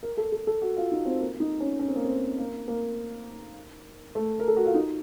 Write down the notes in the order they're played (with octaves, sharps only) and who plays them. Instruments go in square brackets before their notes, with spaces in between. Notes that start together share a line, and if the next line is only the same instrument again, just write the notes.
[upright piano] A#4
A4
A4
A4
F#4
F4
D#4
C4
A#3
D#4
C#4
C#4
C4
A#3
C4
A#3
A#3
A3
A#4
A4
F#4
F4
D#4